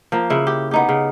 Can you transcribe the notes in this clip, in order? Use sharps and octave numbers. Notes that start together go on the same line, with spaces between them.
F3 A#3
C#3 E4
G4
B3 D#4 G4
C#3